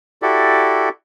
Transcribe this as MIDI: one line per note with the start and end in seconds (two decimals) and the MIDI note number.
0.22 0.89 64
0.22 0.89 66
0.22 0.89 67
0.22 0.89 69
0.22 0.89 74